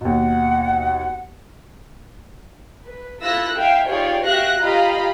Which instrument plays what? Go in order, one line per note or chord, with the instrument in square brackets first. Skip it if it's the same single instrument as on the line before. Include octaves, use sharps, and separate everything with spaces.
[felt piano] D#2 B2 [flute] F#5
[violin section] B4
E4 F4 A4 E6 F#6 A#6
E4 E5 F5 G5
D#4 F4 G4 G#4 C#5 D5
F#4 G4 E5 F5 F#6 A#6
F4 G4 D#5 F5 A#5 B5